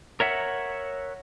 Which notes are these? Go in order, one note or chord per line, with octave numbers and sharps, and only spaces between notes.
A#4 C#5 E5 F#5